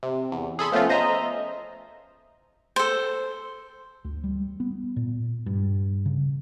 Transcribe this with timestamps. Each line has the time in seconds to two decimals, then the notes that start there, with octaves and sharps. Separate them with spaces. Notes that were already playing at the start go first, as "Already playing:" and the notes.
0.03 C3
0.32 E2
0.59 G#4 A4 B5 C6
0.72 F3 A3 B3 C#4 F4
0.89 C5 D#5 E5 A#5
2.76 A4 C5
4.05 D2
4.24 G3
4.60 B3
4.96 A#2
5.46 G2
6.06 C#3